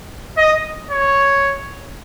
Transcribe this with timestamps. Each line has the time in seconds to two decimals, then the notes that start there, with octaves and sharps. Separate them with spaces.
0.38 D#5
0.91 C#5